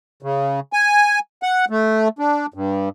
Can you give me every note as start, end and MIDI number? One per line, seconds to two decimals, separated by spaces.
0.23 0.60 49
0.73 1.19 80
1.43 1.65 78
1.70 2.08 57
2.19 2.46 62
2.54 2.89 43